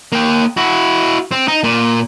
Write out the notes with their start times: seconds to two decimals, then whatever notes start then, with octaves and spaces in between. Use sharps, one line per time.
0.12 A#3 G5
0.57 E4 F#4
1.31 C4
1.48 D#4
1.64 A#2